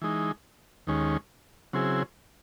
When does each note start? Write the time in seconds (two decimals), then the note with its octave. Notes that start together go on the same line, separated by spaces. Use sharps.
0.02 E3 G#3 D#4
0.87 D#2 D#3 G#3 C#4
1.73 C#3 F#3 C4 E4 G#4